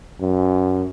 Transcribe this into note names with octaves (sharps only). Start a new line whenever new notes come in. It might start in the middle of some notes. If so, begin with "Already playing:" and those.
F#2